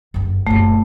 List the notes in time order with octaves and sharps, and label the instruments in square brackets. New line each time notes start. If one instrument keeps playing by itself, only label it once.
[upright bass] F#1 G2
[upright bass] F#1 A#2 [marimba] A3